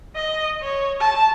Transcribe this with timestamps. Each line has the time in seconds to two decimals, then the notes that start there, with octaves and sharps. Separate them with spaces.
0.16 D#5
0.62 C#5
1.00 A5